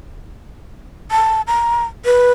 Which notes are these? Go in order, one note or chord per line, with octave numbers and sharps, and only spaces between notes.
A5
A#5
B4